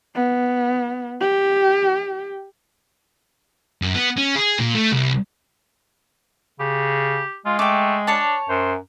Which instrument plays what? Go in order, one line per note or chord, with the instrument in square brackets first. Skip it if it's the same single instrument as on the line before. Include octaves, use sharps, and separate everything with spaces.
[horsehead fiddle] B3
G4
[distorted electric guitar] F#2
B3
C#4
G#4
A#2
A3
C2
[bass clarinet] C#3 [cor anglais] G4
[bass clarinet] G#3 [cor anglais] F4
[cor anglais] A3 [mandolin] G5 D6
[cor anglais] D4 [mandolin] C#5 A5
[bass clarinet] F#2 [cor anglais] C5